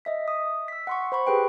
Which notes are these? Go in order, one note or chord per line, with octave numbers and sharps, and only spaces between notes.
D#5 E5 B6
D#6
E6 B6
F#5 C6 C#6
C5 B5 C#6
G4 G#4 B4 G5